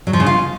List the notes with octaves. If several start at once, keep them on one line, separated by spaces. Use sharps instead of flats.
F#3
F3
C#3
F4